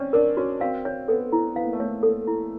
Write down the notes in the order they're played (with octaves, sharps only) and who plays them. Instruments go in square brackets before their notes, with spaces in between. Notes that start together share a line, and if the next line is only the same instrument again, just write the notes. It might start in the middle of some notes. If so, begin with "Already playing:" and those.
Already playing: [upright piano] C4 C#4 [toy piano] D5
[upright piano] D4 [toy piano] A#4
[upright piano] C#4 [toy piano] F#4
[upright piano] C4 [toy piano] F5
[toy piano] C#5
[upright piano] B3 [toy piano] A4
[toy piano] E4
[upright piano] B3 [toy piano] F5
[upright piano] A#3
A3
[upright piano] A#3 [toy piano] C#5
[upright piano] A#3 [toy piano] A4
[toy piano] E4